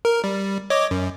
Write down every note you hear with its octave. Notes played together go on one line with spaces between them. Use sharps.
A#4
G3
C#5 D#5 D6
F#2